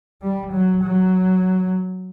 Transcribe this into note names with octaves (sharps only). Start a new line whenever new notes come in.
G3
F#3
F#3